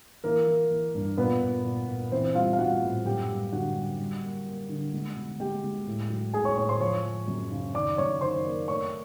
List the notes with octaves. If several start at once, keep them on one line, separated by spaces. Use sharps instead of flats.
E3 A#3 A#4
E3
E3
G2
A#2 B3 B4
A#2
A#2
A#2
E3 C4 C5
G3 F4 F5
F5
G3 F#4 F#5
A2
F#2 G4 G5
G3
D3 F#4 F#5
G3
G3
A#3
A#3
D3
G#3
B2
G#3 G4 G5
G#3
A2
F#3
A2 G#4 G#5
C#5 C#6
A2 C#5 C#6
C5 C6
F3 C#5 C#6
F3
F#2
C#3
D#3 D5 D6
F#2 C#5 C#6
D#3 C5 C6
A#3
A3 C#5 C#6